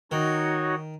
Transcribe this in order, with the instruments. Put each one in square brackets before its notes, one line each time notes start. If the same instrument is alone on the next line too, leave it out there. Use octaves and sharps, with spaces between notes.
[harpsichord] D#3 [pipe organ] D#4 F#4 C#5